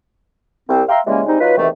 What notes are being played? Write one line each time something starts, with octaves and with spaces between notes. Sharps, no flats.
C2 C4
E5 F5 G5 A#5 C6
C#3 E3 G3 G#3 A#3 C#4
G3 G#3 C4 D#4
F#3 D#4 F4 B4
E2 C3 D#3 E3 A3